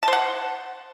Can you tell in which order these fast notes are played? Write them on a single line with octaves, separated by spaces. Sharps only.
A5 C5 F#5